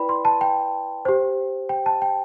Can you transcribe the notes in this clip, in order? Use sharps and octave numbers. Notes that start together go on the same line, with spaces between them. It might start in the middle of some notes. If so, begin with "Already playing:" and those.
Already playing: E4 B4 D5 G5 B5
C6
A5
G5
G4 C5
G5
A5
G5